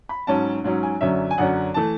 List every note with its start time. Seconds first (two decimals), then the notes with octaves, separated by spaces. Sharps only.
0.09 B5
0.27 G#2 F#3 C#4 A5
0.64 G#2 F#3 C#4
0.83 G#5
1.01 F#2 D3 F#3 C#4 E5
1.31 G#5
1.38 F#2 D3 F#3 C#4 F#5
1.74 E3 A3 A5